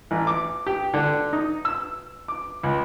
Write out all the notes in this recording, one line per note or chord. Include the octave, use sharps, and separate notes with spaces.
A1
D6
G4
D3
D#4
E6
D6
C#2